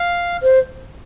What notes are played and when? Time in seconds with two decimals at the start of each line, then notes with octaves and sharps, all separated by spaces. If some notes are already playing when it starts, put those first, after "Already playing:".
Already playing: F5
0.42 C5